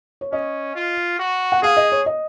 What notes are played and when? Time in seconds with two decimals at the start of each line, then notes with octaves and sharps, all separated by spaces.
0.21 C#5
0.32 C#4 D#5
0.75 F4
1.19 F#4
1.52 F#5
1.62 G#4 F5
1.77 D#5
1.92 C#5
2.06 D#5